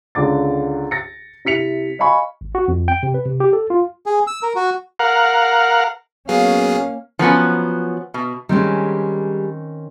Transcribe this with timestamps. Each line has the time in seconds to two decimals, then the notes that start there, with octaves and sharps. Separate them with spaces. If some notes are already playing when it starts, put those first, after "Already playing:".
0.15 C#2 D3 D6 A6
0.91 A6 A#6 C#7
1.45 C3 E4 B6 C#7 F7
1.99 D#5 F5 G#5 B5 C#6
2.41 G#1
2.55 F#4
2.68 F2
2.88 G5
3.03 C3
3.14 B4
3.26 C3
3.40 G4
3.53 A4
3.70 F4
4.06 G#4
4.27 E6
4.43 A#4
4.55 F#4
4.99 A#4 F5 F#5
6.29 F#3 A#3 B3 C#4 G#4 F5
7.19 F3 F#3 B3 C#4
8.14 B2
8.49 D#3 G3 G#3 C4 C#4